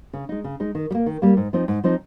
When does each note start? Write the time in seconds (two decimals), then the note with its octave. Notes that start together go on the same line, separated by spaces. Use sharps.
0.13 C#3
0.29 G#3 D#4
0.44 C#3
0.60 G#3 D#4
0.75 D#3
0.91 G3
0.95 A#3
1.06 D#3
1.22 G3 A#3
1.37 G#2
1.53 F3 C4 D#4
1.68 G#2
1.84 F3 C4 D#4